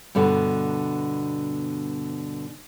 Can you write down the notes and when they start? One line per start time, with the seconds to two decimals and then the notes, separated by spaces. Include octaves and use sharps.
0.15 G2 B2 D3 B3